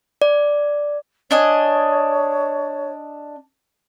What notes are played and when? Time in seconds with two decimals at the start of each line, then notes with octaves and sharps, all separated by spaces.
0.22 D5
1.31 D4 C#5 D#5 G#5